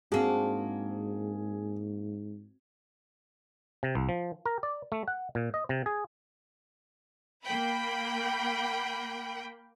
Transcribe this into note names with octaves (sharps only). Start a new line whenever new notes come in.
G#2 A#3 C4 D4 F#4 G#4
C3
C2
F3
A#4
D5
A3
F#5
A#2
D#5
C3
G#4
A#3 G5 B5